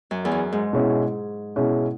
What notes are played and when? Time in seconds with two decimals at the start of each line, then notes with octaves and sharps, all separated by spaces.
0.11 F#2
0.25 E2
0.32 F#2
0.52 G#2
0.73 B2 G#3 C#4 E4
1.56 B2 G#3 C#4 E4